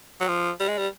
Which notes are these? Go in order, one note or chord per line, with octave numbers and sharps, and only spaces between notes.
F#3
F3
G3
G#3
G3